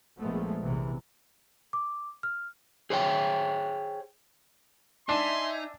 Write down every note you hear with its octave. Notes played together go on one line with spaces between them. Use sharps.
A#1 F3 G#3 A3 B3
A#1 E2 C3 E3
D6
F6
G#4 C5 C#5 G5
D4 D#4 E5 G#5 C6